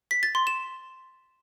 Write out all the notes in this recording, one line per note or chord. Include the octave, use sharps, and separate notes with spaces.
B6
A6
C6
E7